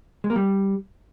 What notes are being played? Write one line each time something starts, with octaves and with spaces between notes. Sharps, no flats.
G#3
A#3
G3